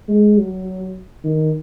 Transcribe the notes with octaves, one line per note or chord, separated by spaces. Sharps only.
G#3
F#3
D#3